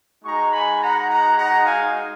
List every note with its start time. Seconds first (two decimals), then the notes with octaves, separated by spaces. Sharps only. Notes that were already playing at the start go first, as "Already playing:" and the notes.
0.23 G#3 D#4 F#4 A#5 C#6
0.52 G#5 B5
0.80 F#5 A#5
1.09 F#5 A#5
1.36 F#5 A#5
1.65 F5 G#5